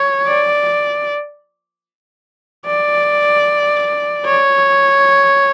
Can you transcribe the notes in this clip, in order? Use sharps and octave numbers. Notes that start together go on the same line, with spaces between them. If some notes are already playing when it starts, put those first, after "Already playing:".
Already playing: C#5
D5
D5
C#5